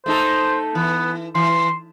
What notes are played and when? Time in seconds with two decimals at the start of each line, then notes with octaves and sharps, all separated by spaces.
0.06 A3 D#4 A4 C5
0.75 E3 B3
1.35 E3 C6